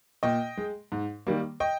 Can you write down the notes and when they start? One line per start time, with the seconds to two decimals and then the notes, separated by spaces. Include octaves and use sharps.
0.23 A#2 D#5 G5
0.57 G#3
0.92 G#2
1.27 D#3 G3 A#3
1.60 D#5 G5